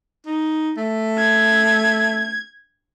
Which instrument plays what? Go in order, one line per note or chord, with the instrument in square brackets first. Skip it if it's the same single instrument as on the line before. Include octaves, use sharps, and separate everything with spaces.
[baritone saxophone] D#4
A3
[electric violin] G#6